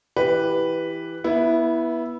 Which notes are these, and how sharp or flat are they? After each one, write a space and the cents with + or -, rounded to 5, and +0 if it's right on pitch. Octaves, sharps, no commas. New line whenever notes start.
E3 +0 G4 +0 B4 +0
B3 -20 E4 +0